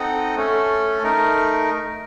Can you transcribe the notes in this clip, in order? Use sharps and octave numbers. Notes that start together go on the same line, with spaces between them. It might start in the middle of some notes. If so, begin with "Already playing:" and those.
Already playing: C4 D#4 A4 D#5 F#5
A3 C#4 A4
A3 D#4 A#4